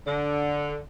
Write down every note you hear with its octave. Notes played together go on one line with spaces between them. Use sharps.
D3